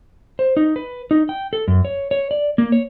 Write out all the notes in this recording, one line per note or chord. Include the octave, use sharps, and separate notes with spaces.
C5
D#4
B4
D#4
G5
A4
F#2
C#5
C#5
D5
A#3
C#5